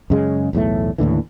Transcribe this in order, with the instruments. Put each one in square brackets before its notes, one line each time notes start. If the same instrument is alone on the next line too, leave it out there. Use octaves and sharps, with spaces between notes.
[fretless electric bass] F#2 C#3 G#3
B1 E2 A2 A3
D#2 A2 D3 E3